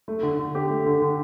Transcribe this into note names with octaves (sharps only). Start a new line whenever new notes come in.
A3
D3
D3
G4
A3
D3
D3